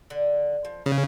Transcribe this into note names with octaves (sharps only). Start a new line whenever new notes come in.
D3
F3
C#3 B4 C#5